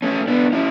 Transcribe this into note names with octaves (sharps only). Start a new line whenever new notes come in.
A3 C#4
B3 D4
C#4 E4